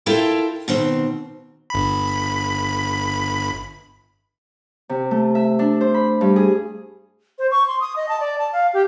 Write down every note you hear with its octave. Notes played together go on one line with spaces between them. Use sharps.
E4 F4 A4 A#4 G5 A5
B2 D#3 C4
G1 B5
C3
A3
E5
D4
C5
B5
G2
G#4
C5
C#6
C6
D#6
D#5
A5
D5
A5
F5
G4